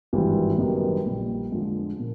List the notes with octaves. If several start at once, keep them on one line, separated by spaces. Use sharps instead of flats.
G#1 G2 E3 G3 C4
F#2 D#3 G3 B3 D#4
A#1 A#2 G3
F2 D3 F3 G#3
A#2